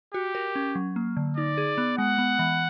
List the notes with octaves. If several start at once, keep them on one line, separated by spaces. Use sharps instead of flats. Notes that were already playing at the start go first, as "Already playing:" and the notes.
F#4 G4
A#4
C#4
F#3
A#3
D3
D#4 D5
G#4
B3
G#3 F#5
B3
E3